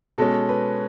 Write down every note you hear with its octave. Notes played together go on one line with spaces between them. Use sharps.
B2 G#3 C#4 A4
B4